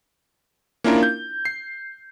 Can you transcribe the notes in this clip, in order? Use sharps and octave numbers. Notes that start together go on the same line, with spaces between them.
A#3 C#4 D4 E4 F4 A#4
G6
C7